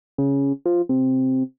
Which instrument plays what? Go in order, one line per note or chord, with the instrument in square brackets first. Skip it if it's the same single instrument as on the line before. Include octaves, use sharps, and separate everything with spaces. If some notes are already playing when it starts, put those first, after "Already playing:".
[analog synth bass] C#3
F3
C3